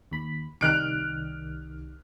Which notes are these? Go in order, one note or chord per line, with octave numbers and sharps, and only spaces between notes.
D#2 B5
C2 D#3 G3 F6 F#6 D7